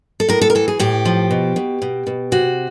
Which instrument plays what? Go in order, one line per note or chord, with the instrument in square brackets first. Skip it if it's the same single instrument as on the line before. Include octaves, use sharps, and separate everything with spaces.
[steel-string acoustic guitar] A4
A2 A#4
A4
A#4
E3 A4
G#4
A2 G4
F3
B2
B2
B2
B2
C3 F#4